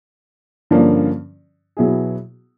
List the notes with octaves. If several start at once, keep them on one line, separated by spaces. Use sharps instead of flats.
G2 D3 F3 A#3 C#4
B2 F#3 B3 E4 G#4